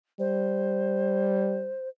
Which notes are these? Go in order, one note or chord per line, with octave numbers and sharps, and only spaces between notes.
G3 C5